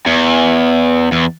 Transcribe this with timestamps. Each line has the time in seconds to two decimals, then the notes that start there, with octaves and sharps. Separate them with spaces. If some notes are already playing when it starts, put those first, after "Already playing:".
0.06 E2
1.12 E2